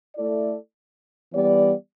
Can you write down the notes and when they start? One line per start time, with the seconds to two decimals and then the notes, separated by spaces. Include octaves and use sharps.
0.15 A3 E4 A4 D5
1.32 E3 G3 B3 G4 D5